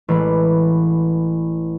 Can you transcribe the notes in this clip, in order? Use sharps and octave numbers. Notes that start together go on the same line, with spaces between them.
A1 E3 G#3 B5 D6